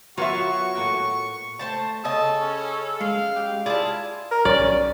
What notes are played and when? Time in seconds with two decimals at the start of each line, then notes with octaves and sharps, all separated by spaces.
0.17 F#3 B3 F4 F#4 A#4 E5 C#6
0.75 A2 A#3 G5
1.59 A3 C5 A5
2.05 C#3 A4 D#5 G#5 A5
2.41 C#4
3.01 G#3 F5
3.36 G4
3.66 E4 F4 G#4 D5 A5
4.31 A#4
4.45 B1 C#4 D5